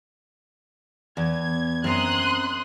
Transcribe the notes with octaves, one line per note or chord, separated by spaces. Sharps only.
E2 G#6
F#2 C4 A#5 C6 D#6 F#6